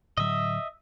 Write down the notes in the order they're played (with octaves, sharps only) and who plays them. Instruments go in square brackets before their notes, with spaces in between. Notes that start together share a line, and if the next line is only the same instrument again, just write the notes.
[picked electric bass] A2 D3 F#3 [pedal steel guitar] D#5 E5